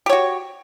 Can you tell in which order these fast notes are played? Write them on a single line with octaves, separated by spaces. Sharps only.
G4 C#5 F#4